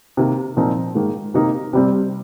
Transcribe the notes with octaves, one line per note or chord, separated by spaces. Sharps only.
C3 D#3 A#3
A#2 F3 C4 D#4
G#2 D#3 A#3
C3 D#3 A#3 D#4
C3 G3 C4